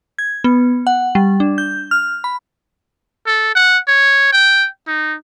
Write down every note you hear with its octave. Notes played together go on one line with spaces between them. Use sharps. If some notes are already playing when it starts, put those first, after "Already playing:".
G#6
B3
F#5
G3
D4
G6
F6
B5
A4
F#5
C#5
G5
D#4